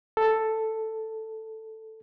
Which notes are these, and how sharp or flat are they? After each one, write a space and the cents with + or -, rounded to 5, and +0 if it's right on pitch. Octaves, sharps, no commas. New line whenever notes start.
A4 +5